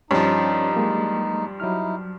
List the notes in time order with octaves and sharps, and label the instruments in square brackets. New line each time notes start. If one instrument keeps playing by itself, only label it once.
[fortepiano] G2 F3 [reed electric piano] C#4 C#5 A5 [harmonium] D#4
[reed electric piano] F#3 G#3 A#3
[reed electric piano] F#3 F6 [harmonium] D#4 E4